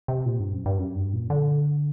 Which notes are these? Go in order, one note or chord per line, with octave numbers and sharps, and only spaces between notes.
C3
A#2
G2
F#2
G2
F#2
G2
A#2
D3